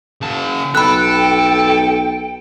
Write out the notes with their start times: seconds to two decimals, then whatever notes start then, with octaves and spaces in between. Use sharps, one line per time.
0.21 C#3 A5
0.75 B1 A4 G5 B5 F#6